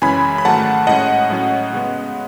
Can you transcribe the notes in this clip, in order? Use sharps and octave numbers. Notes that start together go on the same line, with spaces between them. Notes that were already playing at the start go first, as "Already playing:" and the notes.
F#2 C#3 E3 G#3 C#4 G#5 B5
B5
G#2 D#3 F#3 A3 F#5 A5
A2 G#3 C#4 D#5 F#5
A2 F#3 C#4
C#3 G#3 B3